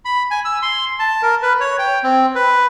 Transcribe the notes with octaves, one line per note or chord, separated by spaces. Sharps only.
B5
G#5
E6
C6
A5
A#4
B4
C#5
G5
C4
B4